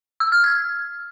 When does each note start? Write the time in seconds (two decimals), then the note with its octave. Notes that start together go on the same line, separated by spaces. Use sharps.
0.20 E6
0.32 F6
0.44 G#6